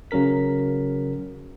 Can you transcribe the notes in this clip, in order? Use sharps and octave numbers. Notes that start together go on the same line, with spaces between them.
C#3 F#3 C#4 A#4 B6